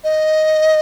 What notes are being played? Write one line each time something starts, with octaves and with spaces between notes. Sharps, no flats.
D#5